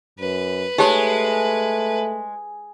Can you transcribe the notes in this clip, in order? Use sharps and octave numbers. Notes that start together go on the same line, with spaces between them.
F#2 B4
G#3 A3 D#4 G4 C#5